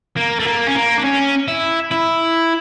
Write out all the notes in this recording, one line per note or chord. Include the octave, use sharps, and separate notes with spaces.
A#3
A3
A#3
C#4
A#3
D4
C#4
E4
E4